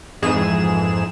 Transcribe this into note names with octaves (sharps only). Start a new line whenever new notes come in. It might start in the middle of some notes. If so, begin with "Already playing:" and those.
F2 G#2 E3 G#4 E7